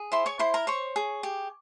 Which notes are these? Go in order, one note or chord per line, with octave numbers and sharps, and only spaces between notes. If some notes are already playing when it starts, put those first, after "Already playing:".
Already playing: G#4
E4 C5 C6
C#5 C#6
E4 C5 C6
A#4 A#5
C5 C#5 C#6
G#4
G4